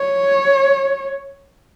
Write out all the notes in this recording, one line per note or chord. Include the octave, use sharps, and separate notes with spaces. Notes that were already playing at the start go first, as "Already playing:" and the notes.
Already playing: C#5